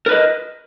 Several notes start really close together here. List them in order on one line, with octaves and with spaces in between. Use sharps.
A#4 B4 D#5